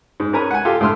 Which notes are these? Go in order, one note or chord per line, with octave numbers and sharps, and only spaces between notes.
G#2
C#4 A#4 B4 G#5 A#5
F#5 G#5
F4 G4 A4
A2 D3 C6 E6 F6